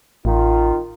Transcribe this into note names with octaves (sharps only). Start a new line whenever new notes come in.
A1 D#3 F4